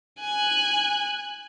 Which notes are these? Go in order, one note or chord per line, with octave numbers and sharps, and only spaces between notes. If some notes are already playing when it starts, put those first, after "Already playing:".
G#5 F#6